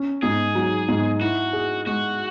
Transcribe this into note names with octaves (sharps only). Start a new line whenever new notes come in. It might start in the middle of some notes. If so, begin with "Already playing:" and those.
Already playing: C#4
G#2 G#4
F#3
G#2
E4 F#4
G#4
G#3 F#4